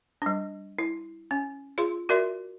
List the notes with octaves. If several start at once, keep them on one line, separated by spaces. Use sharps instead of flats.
G3 D4
E4
C#4
F4 G#4 C6
F#4 A#4 D5 E5 C6